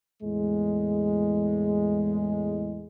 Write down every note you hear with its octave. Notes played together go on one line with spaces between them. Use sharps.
E2 A2 G#3